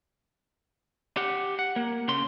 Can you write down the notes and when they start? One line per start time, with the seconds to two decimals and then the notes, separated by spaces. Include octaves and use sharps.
1.17 G4 F#5
1.59 F#5
1.76 A#3
2.08 C#3 C6